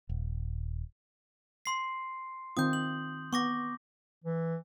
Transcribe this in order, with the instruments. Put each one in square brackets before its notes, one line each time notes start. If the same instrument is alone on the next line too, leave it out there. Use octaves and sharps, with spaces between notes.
[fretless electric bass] D#1
[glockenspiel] C6 C7
[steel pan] D#3 C4 F4 [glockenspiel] D#6 G6
[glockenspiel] F#7
[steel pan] B3 [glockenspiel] C#6 D6 A#6
[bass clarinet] E3